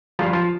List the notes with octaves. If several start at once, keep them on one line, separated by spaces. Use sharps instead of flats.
G#1 G2 F3 G3 F4
F3 F4